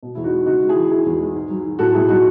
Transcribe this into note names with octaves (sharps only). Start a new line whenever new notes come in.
B2
E2 E4
D#4 F#4
G#3
C#3 D#4 F#4
G#3
E4 G#4
E3
D#3 E4 G#4
E2
G#3
G#2
F#3
D#3
A2 F#4 A4
B1 E4 G#4
F#3 D#4 F#4